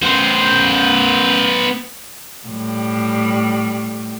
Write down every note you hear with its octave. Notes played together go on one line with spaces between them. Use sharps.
B3 C5
A2 G3